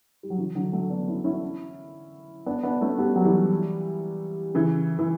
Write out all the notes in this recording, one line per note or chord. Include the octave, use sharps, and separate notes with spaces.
G3
F#3
C#3 E3
D3 F#3
F#3 A3
B3 D4
C#4 E4
C#4 E4
B3 D4
B3 D4
A3 C#4
G3 B3
F#3
E3 G3
C#3 E3
E3